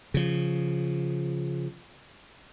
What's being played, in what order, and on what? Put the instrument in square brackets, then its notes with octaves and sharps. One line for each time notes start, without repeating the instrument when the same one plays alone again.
[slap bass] C#3 F3